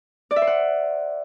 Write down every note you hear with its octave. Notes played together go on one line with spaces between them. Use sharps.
D5
E5
C5
F#5